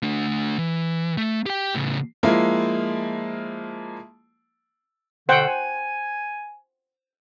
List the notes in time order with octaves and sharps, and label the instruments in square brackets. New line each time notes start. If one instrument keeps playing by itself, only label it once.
[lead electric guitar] A3 D4
E3
A3
G4 G5
A2 C#3
[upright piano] F3 G#3 A#3 E4
[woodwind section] B2 D3 [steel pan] C5 F#5 G5
[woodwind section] G#5